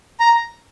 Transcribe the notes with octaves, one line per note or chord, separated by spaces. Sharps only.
A#5